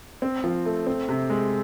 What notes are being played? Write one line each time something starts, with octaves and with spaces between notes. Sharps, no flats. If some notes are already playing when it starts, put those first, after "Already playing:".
C4
F3
A3
C4
C3
G#3